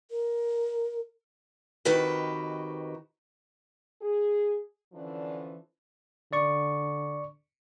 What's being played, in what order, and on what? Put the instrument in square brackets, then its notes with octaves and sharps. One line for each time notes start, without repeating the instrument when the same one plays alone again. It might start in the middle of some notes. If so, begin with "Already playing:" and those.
[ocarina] A#4
[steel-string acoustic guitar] F2 D#3 F#4 G4 B4 D#5
[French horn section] G#4
D3 E3 F3 C#4 D4
[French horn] D3 [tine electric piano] D5 C#6